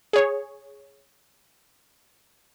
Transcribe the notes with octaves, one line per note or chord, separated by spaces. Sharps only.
G#4 C#5